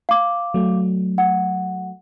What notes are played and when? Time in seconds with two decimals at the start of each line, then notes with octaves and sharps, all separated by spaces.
0.09 F5 D6
0.54 F#3 A3
1.18 F#5